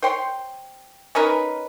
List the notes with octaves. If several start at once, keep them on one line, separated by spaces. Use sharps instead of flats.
C5 C#5 G5 C6
C#4 D#4 A#4 B4